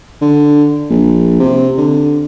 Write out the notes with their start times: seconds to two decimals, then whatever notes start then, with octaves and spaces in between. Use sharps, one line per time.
0.22 D3
0.90 A#1
1.39 C3
1.78 D3